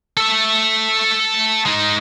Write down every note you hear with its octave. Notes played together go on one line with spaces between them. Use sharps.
A4 E5
G#3 D#4